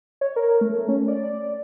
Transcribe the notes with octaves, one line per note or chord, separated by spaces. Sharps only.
C#5
A#4
A3
C#4
D5